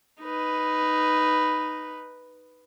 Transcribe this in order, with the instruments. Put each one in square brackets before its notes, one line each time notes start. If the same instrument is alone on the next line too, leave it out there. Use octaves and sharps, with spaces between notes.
[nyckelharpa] D#4 B4